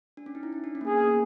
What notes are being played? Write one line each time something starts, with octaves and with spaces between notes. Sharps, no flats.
D4
C#4
D#4
E4
D#4
D4
C#4
A#3
B3 G#4
B3
A#3